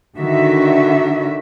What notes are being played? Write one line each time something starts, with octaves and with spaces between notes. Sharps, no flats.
D3 D#3 F#4 E5